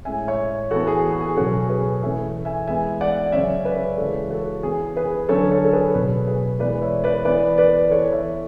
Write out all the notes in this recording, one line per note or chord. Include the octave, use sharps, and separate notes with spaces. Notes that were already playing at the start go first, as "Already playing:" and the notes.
A2 G#3 C#4 E5 G#5
C#5 E5
E3 B3 F#4 A4
G#4
F#4
G#4
B2 F#3 C#4 F#4 A4
G#4 B4
E3 A3 C#4 E5 G#5
E5 G#5
E3 G#3 B3 E5 G#5
D5 F#5
C#3 F#3 C#4 C#5 E5
B4 D5
C#3 E3 G#3 A4 C#5
F#4 A4
E3 B3 G#4
G#4 B4
D3 F#3 C#4 A4 C#5
A4 C#5
A4
G#4 B4
B2 F#3 C#4 G#4 B4
G#4 B4
E3 G#3 B3 B4 D5
C#5 E5
B4 D5
E3 B3 B4 D5
B4 D5
E3 B3 A4 C#5
C#5 E5